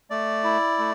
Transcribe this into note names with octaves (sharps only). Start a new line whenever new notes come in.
A3 D5
E4
A3